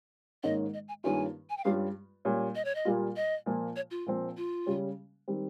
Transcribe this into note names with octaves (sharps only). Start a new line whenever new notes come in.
G#2 D#3 A#3 C#4 D#5
D#5
G#5
G2 D#3 A#3 C#4 F4 G#5
G#5
G5
G2 G3 C#4 F4 F5
A#2 G3 C#4
D#5
C#5
D#5
A#2 G3 A#3 F4
D#5
A#2 F3 A#3 F4
C#5
F4
A#2 F3 C4
F4
C#3 G3 C#4
D#3 G3 C4